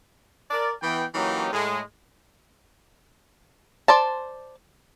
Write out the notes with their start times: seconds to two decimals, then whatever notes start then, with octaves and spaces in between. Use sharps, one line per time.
0.51 A#4 D5
0.82 E3 B3 G5
1.14 E3 F#3 A#3 C#4 D#4 G4
1.52 A2 G#3
3.88 C5 D5 A5